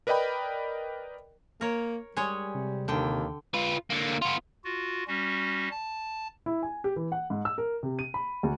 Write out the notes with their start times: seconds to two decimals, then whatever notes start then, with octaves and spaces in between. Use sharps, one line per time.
0.07 A#4 B4 D5 D#5 G5 B5
1.61 A#3 A#4 C#5
2.17 G3 G#3 G#4 C#5
2.54 C3
2.88 D#2 D3 G5
3.54 F4 B4
3.90 D3 A#3
4.22 B3 F4
4.64 F4 F#4
5.08 G3 C#4 F#4
5.71 A5
6.46 E4
6.63 G#5
6.84 G4
6.96 E3
7.12 F#5
7.30 G#2
7.45 E6
7.58 A#4
7.83 C3
7.99 D#7
8.14 B5
8.43 D2